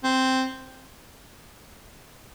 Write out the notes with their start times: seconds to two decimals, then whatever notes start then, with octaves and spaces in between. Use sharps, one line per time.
0.04 C4